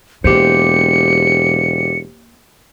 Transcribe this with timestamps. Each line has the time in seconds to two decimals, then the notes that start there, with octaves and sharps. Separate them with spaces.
0.24 E1 A#3 G4 C5 C#7